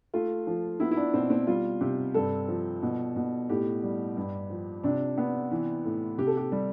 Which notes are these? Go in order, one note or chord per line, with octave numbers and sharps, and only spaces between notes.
A3 F4
F3
B3 E4
E4
D4
B2 C4
C4
G3 F4
C3 G4
G2 A4
F3
B2
B2
A2 G4
G3
G2
F3
C3 D4
B3
E3
A2
C3 G4
A4
G4
G3